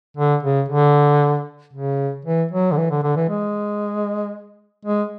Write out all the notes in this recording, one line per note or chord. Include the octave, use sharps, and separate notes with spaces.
D3
C#3
D3
C#3
E3
F#3
D3
E3
D3
D3
E3
G#3
G#3